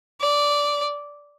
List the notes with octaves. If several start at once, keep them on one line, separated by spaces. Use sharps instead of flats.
D5